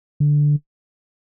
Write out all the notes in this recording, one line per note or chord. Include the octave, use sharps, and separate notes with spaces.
D3